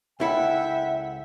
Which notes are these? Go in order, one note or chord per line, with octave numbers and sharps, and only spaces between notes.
C#2 E4 A4 E5 F#5 G5